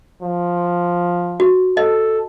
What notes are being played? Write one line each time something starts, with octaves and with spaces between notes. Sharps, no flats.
F3
F#4
A4 D#5